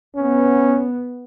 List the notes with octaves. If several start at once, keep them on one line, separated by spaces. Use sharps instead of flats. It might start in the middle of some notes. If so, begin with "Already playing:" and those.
B3 C#4